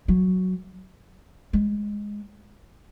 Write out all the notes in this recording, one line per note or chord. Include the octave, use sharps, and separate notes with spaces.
F#3
G#3